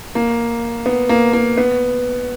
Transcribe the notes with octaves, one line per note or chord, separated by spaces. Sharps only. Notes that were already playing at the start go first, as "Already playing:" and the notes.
A#3
B3
A#3
A#3
B3